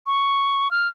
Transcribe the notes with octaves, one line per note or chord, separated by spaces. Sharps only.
C#6
F6